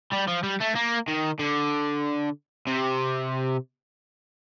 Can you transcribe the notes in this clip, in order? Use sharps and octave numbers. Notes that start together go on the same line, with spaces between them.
G3
F3
G3
A3
A#3
D#3
D3
C3